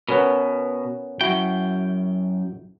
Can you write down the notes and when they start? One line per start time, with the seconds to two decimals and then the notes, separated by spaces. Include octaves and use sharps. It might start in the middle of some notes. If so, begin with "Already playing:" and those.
0.09 B2 B3 C#4 A#4
1.21 F#2 E4 F#4 G5